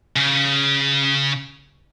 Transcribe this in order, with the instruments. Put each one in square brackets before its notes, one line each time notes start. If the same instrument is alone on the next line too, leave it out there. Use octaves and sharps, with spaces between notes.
[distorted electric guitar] C#3